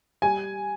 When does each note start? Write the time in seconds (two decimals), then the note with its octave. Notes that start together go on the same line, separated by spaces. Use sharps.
0.22 G3 G#5